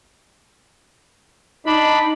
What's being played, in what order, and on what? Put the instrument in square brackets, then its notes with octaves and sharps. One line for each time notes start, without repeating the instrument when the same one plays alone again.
[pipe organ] D4 B5 [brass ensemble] D#4